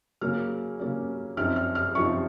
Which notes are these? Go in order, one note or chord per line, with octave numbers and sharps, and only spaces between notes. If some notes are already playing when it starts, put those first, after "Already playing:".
C#3 F#3 A#3 C#4 F6
C#3 F#3 A#3 C#4
F#2 F3 C4 D#4 F6
F6
F6
F#2 F3 C4 D#4 C#6